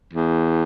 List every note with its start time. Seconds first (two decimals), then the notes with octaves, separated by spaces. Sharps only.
0.13 E2